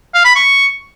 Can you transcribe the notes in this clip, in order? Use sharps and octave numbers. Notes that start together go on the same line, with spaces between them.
F5
B5
C#6